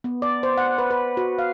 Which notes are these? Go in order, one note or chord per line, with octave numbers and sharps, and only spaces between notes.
B3
D5
C5
F#5
B4
B4
F#4
F5